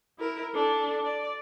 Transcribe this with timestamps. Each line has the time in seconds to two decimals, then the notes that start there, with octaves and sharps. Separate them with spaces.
0.19 E4 A#4
0.55 D4 A4
1.04 D5